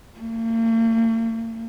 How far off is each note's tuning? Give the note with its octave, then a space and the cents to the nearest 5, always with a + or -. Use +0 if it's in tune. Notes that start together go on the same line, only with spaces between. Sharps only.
A#3 -45